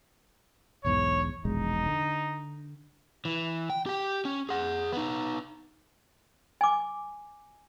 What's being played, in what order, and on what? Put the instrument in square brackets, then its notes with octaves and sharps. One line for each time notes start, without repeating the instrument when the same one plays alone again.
[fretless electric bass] B1 E2 G#2 [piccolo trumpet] C#5
[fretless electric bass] E1 A#1 G#3 [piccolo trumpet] D#4
[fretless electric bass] D3
[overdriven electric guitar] E3
G5
G4 G5
C#4
G#4 F#5
B3 D#4
[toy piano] G#5 D6